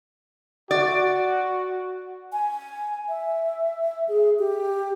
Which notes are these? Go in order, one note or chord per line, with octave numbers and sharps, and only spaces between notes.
F#4 D5
G#5
E5
G#4
G4